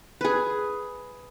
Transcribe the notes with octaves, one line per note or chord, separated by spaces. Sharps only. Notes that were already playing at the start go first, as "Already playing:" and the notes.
G#4 B4